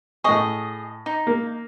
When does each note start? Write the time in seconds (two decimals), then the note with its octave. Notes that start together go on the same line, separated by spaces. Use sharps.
0.24 A2 G#4 D#5 C#6
1.06 D#4
1.27 A#3